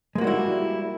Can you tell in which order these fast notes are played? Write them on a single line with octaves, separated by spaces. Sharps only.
G#3 A#3 F#4 G3 E4